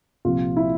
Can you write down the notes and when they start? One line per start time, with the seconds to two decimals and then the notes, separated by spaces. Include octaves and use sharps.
0.25 C2 A#2 F3 F4
0.57 E4